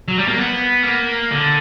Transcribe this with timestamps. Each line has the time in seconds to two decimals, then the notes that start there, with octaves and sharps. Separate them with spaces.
0.08 F#3
0.18 G3
0.28 A#3
0.38 B3
0.83 A#3
1.31 D3